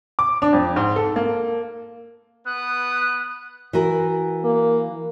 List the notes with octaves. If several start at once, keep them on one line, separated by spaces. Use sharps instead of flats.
D6
D4
F2
G#2
A4
A#3
B3 B4 D#6 F#6
E3 F#4 A#4
A#3